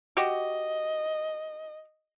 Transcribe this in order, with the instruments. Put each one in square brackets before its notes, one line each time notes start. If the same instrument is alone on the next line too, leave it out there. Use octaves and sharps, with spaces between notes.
[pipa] F#4 G4 [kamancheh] D#5